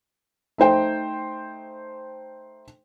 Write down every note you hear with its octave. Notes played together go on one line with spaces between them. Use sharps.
A3 D#4 C5 G5